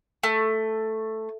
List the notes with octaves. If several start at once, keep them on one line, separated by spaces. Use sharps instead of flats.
A3